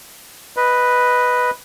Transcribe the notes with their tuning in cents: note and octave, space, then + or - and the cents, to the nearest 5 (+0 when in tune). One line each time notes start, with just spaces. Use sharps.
B4 +0 D#5 +0